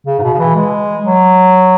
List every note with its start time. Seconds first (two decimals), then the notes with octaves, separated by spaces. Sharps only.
0.06 C#3
0.19 G#2
0.22 B2
0.33 C#3
0.39 E3
0.55 G#3
1.05 F#3